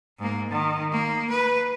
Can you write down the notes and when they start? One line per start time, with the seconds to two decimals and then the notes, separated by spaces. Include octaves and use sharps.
0.19 G#2 A#3
0.50 D#3
0.91 A#3
1.30 B4